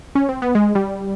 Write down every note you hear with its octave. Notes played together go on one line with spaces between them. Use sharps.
C#4
C4
B3
G#3
G3